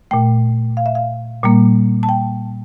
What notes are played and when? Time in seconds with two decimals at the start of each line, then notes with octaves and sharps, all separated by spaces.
0.11 A#2 A3 G5
0.77 F5
0.86 E5
0.95 F5
1.43 A#2 G3 A#3
2.03 A5
2.09 G5